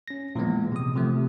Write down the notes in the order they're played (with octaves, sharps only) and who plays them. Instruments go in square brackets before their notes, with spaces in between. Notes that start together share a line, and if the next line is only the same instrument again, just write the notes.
[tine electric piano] C#4 A#6
A#2 E3 F3 G#3 B3
C3 D#6
C3 E3 F3 A3